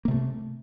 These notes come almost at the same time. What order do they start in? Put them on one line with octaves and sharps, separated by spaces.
A#3 C3 A3